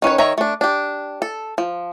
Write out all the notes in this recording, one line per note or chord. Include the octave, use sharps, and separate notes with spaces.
D#3 C#4 B4 C#5
D#3 C#5 E5 A#5
A3 D4
D4 G4
A4
F3